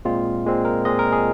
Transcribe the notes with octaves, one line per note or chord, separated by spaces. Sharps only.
A#2 G#3 C4 F4
A#2 G#3 C4
A#4
A#2 G#3 C4 D#5
A#4
G#4